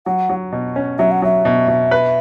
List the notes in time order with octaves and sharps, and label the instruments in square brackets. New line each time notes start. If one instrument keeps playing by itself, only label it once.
[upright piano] F#3 [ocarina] F#5
[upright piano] F#3
B2
C#4
[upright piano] F#3 [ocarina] E5
[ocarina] F#5
[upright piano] F#3 [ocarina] E5
[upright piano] B2
B2
B4